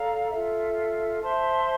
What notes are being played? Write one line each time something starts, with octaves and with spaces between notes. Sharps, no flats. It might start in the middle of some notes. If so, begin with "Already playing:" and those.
Already playing: A4 D5 F5 A#5
F4 A4 E5
C5 E5 A5 C6